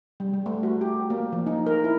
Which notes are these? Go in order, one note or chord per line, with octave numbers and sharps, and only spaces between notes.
G3
G3
A3
F#4
G4
A#3
F3
D#4
A#4
E4